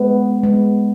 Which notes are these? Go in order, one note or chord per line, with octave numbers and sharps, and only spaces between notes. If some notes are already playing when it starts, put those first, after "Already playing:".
Already playing: G#3 B3
G#3 B3